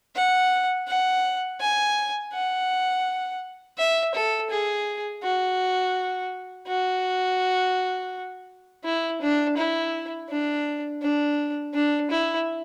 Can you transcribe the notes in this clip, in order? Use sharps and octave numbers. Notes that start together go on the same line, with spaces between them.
F#5
F#5
G#5
F#5
E5
A4
G#4
F#4
F#4
E4
D4
E4
D4
D4
D4
E4